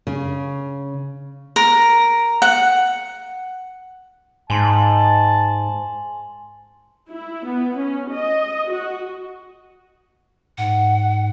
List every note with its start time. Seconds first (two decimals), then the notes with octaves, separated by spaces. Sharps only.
0.07 C#3
1.56 A#4
2.42 F#5
4.50 G#2 G#5 A5 C6 F#7
7.09 E4
7.46 B3
7.78 C#4
8.14 D#5
8.70 F#4
10.58 G#2 F#5